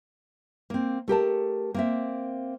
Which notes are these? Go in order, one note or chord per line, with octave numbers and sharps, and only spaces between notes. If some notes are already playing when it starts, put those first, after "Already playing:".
A#3 C4
A3 G4 A#4 A5
A#3 C4 E5